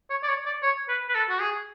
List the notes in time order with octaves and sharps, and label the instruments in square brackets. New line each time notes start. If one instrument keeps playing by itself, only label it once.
[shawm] C#5
D5
C#5
D5
C#5
B4
B4
A4
F#4
G#4